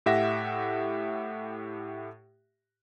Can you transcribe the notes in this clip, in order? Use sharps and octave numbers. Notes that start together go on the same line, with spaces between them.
A2 G4 E5 F#5 A#6